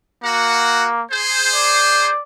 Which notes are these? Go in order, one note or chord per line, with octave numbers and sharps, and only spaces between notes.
A#3 F#4 F#5
G#4 C5
D5